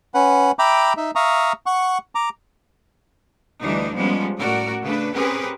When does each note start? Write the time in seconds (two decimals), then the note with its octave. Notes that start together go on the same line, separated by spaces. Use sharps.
0.14 C#4 B4 F#5
0.59 E5 G5 A#5 B5 D6
0.97 D#4 E5
1.15 E5 F5 A#5 C#6 D#6
1.66 F#5 C#6
2.15 A#5 D6
3.61 D2 E3 G3 D4 D#4
3.94 F3 G3 G#3 B3 C#4
4.39 A2 C#4 F#4 A#4 D5
4.83 C#3 A3 D4 B4
5.14 C4 C#4 G4 G#4 A#4 B4